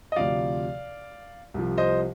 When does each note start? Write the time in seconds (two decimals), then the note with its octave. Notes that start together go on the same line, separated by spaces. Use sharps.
0.12 D#5
0.16 D2 C3 F3 D5 F5
1.54 C2 C3 F3
1.78 C5 D#5